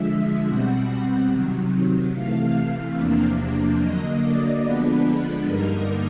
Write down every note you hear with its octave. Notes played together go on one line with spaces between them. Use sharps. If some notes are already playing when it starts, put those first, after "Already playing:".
Already playing: D3 F3 G#3 E5
B2 G3 C4 F#5
C3 D#3 F#3
C3 E3 A3 F5
E2 C3 F3 A#3 D4
D3 F#3 A#3 D#5
D5
D3 F3 G#3 B3 D4 B4
G2 D3 G3 A#3 D#4 A#4